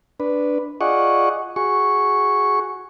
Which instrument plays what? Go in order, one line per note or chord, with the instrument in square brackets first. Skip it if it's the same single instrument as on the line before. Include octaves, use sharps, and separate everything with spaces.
[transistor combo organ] D4 B4
F4 G#4 D5 D#5 F#5 C#6
F#4 G#4 C#6